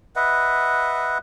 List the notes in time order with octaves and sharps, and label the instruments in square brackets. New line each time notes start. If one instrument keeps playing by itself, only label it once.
[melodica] B4 D#5 E5 F#5